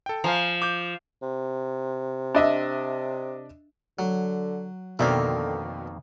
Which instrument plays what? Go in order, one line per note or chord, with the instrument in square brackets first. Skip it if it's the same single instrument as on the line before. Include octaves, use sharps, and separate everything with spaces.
[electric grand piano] A4 G5
[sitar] F3 [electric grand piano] F5 G#5 A#5
[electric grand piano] D6 G6
[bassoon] C3
[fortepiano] D4 D#5 E5
[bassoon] D3 [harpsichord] F#3
[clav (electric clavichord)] F2 D#3 A#3 [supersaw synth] B2 [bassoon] D3 [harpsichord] C4 D5 E5